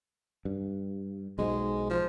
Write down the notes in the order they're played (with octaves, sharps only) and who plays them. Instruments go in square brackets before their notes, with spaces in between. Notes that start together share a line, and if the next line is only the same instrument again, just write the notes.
[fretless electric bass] G2
[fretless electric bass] B1 G#2 [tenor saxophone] G#3
[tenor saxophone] F3